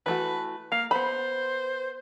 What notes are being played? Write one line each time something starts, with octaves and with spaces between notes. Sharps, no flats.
E3 A3 F#4 B4
A#3 F5
B3 C5 B5